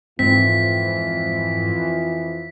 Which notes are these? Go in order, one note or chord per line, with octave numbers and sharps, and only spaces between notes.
F2 G#2 E3 F3 C4 B6